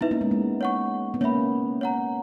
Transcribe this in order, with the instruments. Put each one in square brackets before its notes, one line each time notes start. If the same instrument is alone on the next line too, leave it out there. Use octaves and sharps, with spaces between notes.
[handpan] B3 D#4 [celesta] E4 B4 E5
[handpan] A#3 C#4
G#3 B3
G#3 B3
[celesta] C#5 F#5 C#6
[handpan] B3
[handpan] A#3 C#4 [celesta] C#5 E5 B5
[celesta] C#5 F#5 A#5